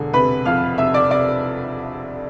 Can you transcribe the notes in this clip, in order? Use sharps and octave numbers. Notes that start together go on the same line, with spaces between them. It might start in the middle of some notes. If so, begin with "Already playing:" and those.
Already playing: E1 D3
C3 B4 B5
F2 F5 F6
C3 E5 E6
D5 D6
C3 D5 D6